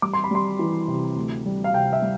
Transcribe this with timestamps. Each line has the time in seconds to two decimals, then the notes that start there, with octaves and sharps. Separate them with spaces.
0.02 G3 D6
0.13 C6
0.24 B5
0.31 G3 C6
0.59 E3
0.88 C3
1.16 D2
1.46 G3
1.64 F5
1.74 C3 G5
1.93 E5
2.02 G3